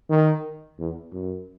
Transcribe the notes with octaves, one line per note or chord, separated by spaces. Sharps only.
D#3
E2
F#2